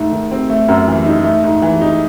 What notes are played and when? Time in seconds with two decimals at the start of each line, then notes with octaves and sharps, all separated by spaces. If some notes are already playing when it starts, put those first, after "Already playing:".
Already playing: G#2 A3
0.12 D#3
0.31 C4
0.50 A3
0.68 F#2
0.88 E3
1.06 D#4
1.24 A3
1.44 G#2
1.62 E3
1.81 D#4